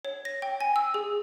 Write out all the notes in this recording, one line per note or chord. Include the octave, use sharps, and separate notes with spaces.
C#5
A#6
G5
G#5
E6
G#4